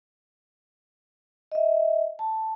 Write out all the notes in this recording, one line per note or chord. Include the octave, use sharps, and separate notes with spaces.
D#5 E5
A5